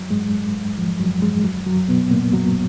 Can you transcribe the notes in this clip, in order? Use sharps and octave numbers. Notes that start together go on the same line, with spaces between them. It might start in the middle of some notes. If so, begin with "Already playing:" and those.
Already playing: F#2 F#3
G#2 G#3
F2 F3
F#2 F#3
G#2 G#3
F#2 F#3
F#2 F#3
B2 B3
A#2 A#3
F#2 F#3